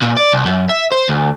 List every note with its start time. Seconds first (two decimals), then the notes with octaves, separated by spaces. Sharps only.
0.02 A#2
0.17 D5
0.32 C2
0.45 F#2
0.69 E5
0.92 C5
1.08 D2